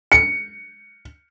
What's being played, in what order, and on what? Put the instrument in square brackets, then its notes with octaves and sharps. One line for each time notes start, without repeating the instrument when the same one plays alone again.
[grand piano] C#7